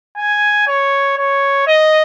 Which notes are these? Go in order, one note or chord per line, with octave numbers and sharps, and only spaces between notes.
G#5
C#5
C#5
D#5